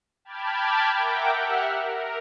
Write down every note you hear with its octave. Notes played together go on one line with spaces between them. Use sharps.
G5 A5 B5 D6 F6 G#6
A#4 E5 F#5 G5 D6
G4 E5 F#5 F6
A#4